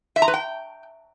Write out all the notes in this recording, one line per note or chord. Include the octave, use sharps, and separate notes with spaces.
E5
A#5
B4
G5